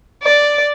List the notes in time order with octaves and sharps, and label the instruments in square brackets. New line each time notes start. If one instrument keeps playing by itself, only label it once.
[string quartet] D5